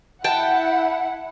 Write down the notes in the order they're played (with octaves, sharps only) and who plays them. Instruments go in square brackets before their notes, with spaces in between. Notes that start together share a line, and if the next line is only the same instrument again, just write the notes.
[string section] E4 F#5 [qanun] G5 A5